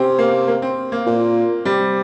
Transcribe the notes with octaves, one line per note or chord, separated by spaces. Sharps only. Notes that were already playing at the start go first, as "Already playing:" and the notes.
Already playing: C3 C4 C#4
A#3
A#3
C4
A#3
A#2
C3 G3